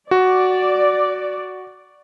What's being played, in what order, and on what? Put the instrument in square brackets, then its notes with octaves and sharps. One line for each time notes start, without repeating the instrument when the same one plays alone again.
[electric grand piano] F#4 [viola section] D5